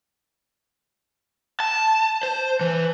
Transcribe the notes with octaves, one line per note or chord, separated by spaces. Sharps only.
A5
C5
E3